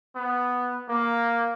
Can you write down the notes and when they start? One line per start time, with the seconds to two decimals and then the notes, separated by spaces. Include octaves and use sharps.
0.15 B3
0.89 A#3